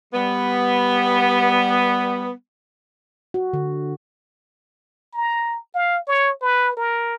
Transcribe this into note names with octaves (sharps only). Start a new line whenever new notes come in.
G3 B3
F#4
D3
A#5
F5
C#5
B4
A#4